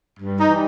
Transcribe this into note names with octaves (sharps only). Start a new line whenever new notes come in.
G2
D#4
E3 G3